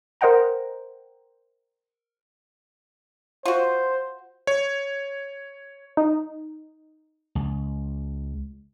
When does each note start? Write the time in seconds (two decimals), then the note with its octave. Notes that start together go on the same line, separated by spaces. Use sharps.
0.21 A#4 C5 D#5 F#5 G5 A#5
3.46 F4 F#4 C5
4.47 C#5
5.97 D#4
7.35 C#2